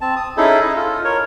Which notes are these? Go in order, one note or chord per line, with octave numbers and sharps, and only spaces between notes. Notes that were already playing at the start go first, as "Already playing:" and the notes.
C4 A5
D#6
C#4 D#4 E4 G#4 A4
D#5
F4 A4
A#4 C#5